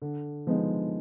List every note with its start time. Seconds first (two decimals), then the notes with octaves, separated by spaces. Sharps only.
0.02 D3
0.47 F3 G#3 B3 D#4